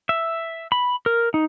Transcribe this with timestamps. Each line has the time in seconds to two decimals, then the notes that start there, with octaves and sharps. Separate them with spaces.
0.09 E5
0.72 B5
1.06 A#4
1.34 D#4